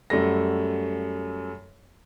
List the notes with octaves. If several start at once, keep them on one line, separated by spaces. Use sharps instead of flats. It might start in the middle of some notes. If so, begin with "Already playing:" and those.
F#2 G3 A3 A#6